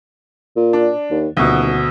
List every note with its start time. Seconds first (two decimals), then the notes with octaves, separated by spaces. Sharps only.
0.56 A#2
0.73 D4
1.10 D#2
1.37 D#1 D2 B2